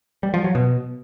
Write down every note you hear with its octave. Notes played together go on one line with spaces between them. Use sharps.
G3
F3
F#3
B2